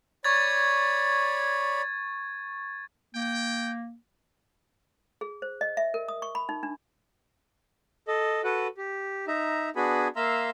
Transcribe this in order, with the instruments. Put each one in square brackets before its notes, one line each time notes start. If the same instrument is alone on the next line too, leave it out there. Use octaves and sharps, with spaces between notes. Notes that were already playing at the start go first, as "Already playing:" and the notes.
[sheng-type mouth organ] C#5 D5 B5 [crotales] C#6 G#6 A6
[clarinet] A#3 [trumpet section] G5
[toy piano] G#4
C5
D#5
E5
A#4
D#6
C#6
B5
D#4
D4
[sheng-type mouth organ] A4 D#5
F#4 A4 B4 F#5
G4
D#4 E5 A#5
B3 D4 F#4 G#4 G#5 B5
A#3 E5 F5 A#5 C6 E6